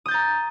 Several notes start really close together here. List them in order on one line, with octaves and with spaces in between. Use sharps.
D#6 G6 A6 A#5